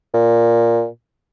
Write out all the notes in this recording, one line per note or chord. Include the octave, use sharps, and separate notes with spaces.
A#2